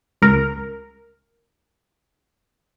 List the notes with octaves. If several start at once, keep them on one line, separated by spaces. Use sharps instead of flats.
C#2 A#4